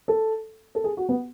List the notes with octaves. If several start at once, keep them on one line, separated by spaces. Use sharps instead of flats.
A4
A4
G#4
F#4
B3